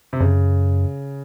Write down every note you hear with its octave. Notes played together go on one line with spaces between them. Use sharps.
C3
F#2 C#3